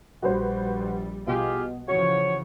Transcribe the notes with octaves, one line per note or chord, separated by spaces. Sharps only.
A#1 G3 F#4 B4 C5
B2 F4 G4 G#4
C#3 E3 F3 F#4 C#5